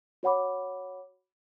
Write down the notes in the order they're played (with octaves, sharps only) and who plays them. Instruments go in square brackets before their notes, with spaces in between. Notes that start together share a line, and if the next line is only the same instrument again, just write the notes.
[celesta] F#4 C#5 F#5 B5 D6